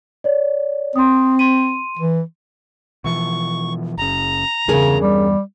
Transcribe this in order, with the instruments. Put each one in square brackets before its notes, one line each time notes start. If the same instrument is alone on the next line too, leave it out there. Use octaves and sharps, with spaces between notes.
[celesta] C#5 D5
[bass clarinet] C4 [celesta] C6 D#6
[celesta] C6 D#7
[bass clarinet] E3
[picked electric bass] B2 E3 F3 [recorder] C#6
[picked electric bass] F#1 C#3 [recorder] A#5
[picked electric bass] E2 G2 [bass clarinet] C#3 [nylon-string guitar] C#4 G#4 A#4
[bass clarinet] G3